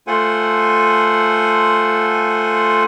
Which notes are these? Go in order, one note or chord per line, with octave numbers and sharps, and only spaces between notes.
A3 F4 A4 C5 F#5 G#5